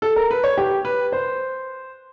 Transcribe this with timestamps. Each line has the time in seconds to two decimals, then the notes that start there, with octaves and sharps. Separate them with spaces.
0.02 A4
0.16 A#4
0.30 B4
0.44 C#5
0.58 G4
0.85 B4
1.12 C5